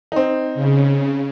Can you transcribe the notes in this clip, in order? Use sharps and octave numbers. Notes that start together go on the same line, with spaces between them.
C4 D#4
C#3